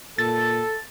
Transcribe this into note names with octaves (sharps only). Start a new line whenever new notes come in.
A#2 A4 A6